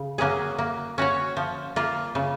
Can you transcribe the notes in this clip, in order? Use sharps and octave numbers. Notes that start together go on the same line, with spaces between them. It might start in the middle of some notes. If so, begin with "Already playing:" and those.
Already playing: C#3
F#3 A#3 C#4 G#4
A#3
C#4 F#4 C#5
F3
A#3 F4
C#3